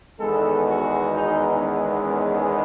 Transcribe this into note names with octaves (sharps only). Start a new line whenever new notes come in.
E2 D#3 G#3 B3 A4
F#4
D#4
C#4
C#4